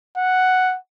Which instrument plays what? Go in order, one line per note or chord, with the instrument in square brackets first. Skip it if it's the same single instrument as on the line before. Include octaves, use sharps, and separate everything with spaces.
[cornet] F#5